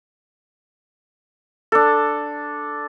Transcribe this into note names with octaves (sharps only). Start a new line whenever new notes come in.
D4 A4